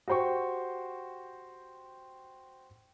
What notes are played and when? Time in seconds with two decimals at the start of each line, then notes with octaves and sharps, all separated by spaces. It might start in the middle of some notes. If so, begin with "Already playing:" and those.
0.08 F#4 G4 C5 G5 C#6